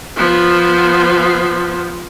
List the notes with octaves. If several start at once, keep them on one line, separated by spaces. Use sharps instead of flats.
F3 B3